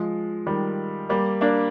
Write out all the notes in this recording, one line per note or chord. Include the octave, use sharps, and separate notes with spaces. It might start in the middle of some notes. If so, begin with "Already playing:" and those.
Already playing: F3 G#3
D#3 G3
G3 A#3
A#3 D4